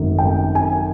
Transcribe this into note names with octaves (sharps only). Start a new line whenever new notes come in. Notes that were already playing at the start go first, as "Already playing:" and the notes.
Already playing: G#1 F#2 D#3 F#3 A3
G5
G#5